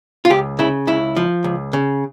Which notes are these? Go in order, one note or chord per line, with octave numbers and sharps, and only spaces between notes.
F4
C#2 G4
C#3 E4
C#2 E4
F3
C#2
C#3